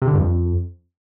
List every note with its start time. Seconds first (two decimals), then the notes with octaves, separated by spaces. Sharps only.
0.02 C3
0.08 D3
0.14 G2
0.20 F2